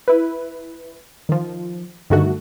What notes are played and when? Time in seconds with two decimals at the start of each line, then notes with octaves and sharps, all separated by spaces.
0.08 E4 B4
1.29 D#3 F3
2.10 G2 D3 D#3 A3 F#4